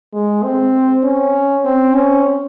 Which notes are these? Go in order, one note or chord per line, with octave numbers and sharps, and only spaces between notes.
G#3
C4
C#4
C4
C#4